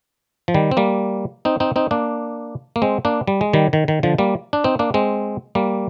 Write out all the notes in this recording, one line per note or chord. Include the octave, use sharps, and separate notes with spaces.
F3
D#3 G3
C4
G3 A#3
C4 D#4
C4 D#4
C4 D#4
A#3 D4
A#3
G#3 C4
A#3 D4
G3
G#3
D#3 G3
D#3
D#3
D3 F3
G3 A#3
D4
C4 D#4
A#3 D4
G#3 C4
G3 A#3